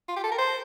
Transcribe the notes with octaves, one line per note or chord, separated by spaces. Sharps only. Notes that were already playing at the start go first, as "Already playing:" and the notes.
F4
G4
A4
A#4
C5